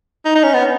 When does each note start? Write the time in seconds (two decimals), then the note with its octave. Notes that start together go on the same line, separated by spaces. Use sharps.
0.25 D#4
0.35 D#4
0.43 C#4
0.54 B3